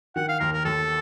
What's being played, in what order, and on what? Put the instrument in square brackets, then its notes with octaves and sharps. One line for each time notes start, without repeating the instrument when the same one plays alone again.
[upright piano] D#3 [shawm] F#5
[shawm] F5
[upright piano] D#2 [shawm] A#4
[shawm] A#4
[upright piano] D#2 [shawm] A4